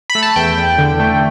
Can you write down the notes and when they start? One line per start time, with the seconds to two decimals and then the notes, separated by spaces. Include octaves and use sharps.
0.10 B5
0.15 A3
0.23 A5
0.36 E2 G5
0.57 E2
0.78 D3
1.00 A3